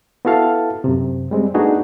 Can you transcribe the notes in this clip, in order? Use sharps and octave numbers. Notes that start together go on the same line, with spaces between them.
B3 E4 F#4 A4 F5 A5
F#2 C3
G3 G#3 C4
A3 B3 D4 D#4 F#4 G#4